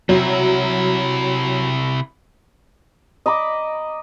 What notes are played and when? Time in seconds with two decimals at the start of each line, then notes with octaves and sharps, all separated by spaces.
0.09 C3 F#3 E4
3.26 D#5 A#5 B5 D6